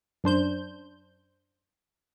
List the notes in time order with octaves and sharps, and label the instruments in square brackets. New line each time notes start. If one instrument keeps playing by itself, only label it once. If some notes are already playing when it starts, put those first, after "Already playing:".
[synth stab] F#2 D4 C5 G6